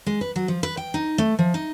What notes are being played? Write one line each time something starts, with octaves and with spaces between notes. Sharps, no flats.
G#3
B4
F#3
F3
B4
G5
D#4
A3
F3
D#4